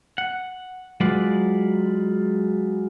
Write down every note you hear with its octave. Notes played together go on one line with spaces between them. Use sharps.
F#5
F#3 G#3 F4 B4 D5